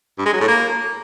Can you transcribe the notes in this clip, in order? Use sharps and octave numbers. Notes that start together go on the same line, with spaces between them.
G2
G#3
F#3
A2
A#3